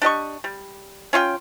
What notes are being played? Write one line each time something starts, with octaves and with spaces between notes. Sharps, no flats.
D4 G4 D#5 C#6
G3
C#4 F4 E5 G5